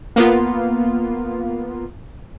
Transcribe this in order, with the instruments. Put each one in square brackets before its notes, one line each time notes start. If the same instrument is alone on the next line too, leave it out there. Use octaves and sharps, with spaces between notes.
[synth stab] A#3 B3 F4